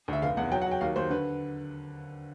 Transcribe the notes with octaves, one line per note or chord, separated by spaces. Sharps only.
D2 E5
F1 F5
E2 F#5
F#3 G5
F#5
F#3
G5
D#2 F5
D#2 C5
D3 B4